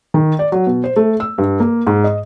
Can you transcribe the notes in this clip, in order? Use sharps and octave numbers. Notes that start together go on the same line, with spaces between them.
D#3
D5
F#3
B2
C5
A3
E6
G2
A#3
G#2
D#5